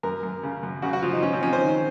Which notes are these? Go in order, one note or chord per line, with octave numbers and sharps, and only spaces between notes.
F#2 A#4
F#2
C#3
F#2
C#3 F#4
F#4
F3 F4
D#4
F3 C#4
C4
F3 C#4
C5
D#3